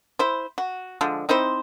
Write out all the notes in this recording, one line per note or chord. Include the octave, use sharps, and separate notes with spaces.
E4 C5
F#4
D3 F3 G#3
C4 D#4 E4 C5